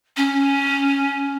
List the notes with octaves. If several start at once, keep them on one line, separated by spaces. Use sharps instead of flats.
C#4